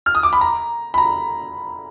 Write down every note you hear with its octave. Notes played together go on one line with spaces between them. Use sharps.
F6
D#6
D6
B5
A#5
B5
A#5